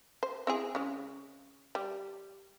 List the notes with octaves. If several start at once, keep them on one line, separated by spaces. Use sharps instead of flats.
C5
C4 E4 G#4
C#3 G#3
G3